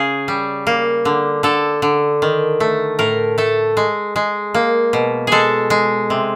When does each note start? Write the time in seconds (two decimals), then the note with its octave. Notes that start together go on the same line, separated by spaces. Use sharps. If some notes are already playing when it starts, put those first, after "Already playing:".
Already playing: C#3 G#4
0.28 G3
0.67 A#3
1.05 D3
1.43 D3 A4
1.82 D3
2.22 D#3
2.60 A3
2.99 A2 A#4
3.38 A3 A4
3.77 G#3
4.16 G#3
4.54 A#3
4.93 B2
5.27 G#3 G#4 A4
5.70 G#3
6.10 C3